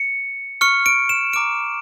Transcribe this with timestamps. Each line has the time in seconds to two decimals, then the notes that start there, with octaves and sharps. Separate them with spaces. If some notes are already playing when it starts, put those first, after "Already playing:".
Already playing: C#7
0.61 C#6 F6 C#7
0.86 D7
1.09 E7
1.33 A#5 D6 F6 D7